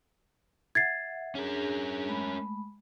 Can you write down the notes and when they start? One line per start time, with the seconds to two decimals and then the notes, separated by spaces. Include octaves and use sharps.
0.75 E5 F#5 G#6 A6 C7
1.35 C#4 D4 G#4 A#4
2.05 G#3 A3 B5